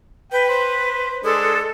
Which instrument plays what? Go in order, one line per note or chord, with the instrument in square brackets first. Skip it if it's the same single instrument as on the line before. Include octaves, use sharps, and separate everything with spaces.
[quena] B4 [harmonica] G5
[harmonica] C5
[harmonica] G#3 D4 [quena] A4